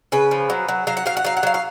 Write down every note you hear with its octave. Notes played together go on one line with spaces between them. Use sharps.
C#3 B4
F3
F#3
F#3
F#3 F5
F#5
F#3 F5
F#5
F#3 F5
F#5
F#3 F5
F5